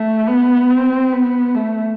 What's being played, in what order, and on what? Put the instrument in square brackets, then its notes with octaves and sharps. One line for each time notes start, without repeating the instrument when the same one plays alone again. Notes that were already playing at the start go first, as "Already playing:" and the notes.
Already playing: [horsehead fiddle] A3
B3
C4
B3
A3